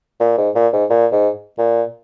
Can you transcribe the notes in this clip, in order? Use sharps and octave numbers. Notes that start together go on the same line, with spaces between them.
A#2
G#2
A#2
G#2
A#2
G#2
A#2